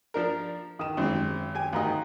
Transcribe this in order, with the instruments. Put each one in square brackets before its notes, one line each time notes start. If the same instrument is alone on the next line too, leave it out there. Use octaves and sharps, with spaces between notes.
[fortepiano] F3 D4 A#4
[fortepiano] D#3 [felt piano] D#6 E7
[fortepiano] G#1 C4 [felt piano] F#2 D#3 G#3
[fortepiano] G4 G#5
[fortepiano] D2 D#3 D#5 [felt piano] F5 A#5